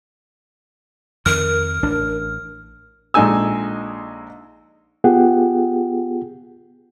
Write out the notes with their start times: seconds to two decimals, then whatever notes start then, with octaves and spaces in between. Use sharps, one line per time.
1.26 F2 D#3 A#4 F6
1.83 A1 D4
3.14 A#1 G#3 D#4 A4 G#5 E6
5.04 B3 F4 G4 G#4 F#5 G5